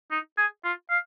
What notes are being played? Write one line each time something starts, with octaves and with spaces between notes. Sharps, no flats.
D#4
G#4
F4
F5